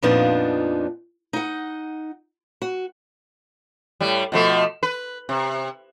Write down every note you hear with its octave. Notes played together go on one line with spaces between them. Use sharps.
F2 A#2 F3 B3 D4 D#4
D#4 F#5
F#4
A2 G3
B2 F3 A3
B4
C3